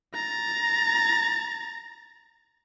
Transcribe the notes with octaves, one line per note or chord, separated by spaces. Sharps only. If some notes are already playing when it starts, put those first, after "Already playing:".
A#5 A6